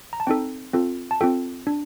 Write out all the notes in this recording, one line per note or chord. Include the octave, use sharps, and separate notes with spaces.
A#5
A5
C4 D#4 A4 G5
C4 F4 A4
A5
C4 F4 A4 G5
D4